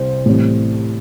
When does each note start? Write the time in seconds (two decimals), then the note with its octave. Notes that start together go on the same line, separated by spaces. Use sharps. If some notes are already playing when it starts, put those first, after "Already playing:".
Already playing: C2 C3 C5
0.26 A2 E3 G3 C4